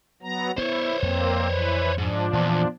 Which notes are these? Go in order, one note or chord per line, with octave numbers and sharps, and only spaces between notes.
F#3 B3 A#5
B3 E4 C5 C#5
F2 A#3 C4
E3 B4
G#2 F3 D4
E2 A#2